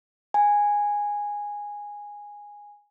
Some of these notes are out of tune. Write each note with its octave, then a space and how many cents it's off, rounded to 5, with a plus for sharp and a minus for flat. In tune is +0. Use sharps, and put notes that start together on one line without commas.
G#5 -10